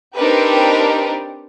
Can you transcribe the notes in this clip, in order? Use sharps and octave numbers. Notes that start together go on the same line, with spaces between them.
C4 D4 D#4 G4 A#4 B4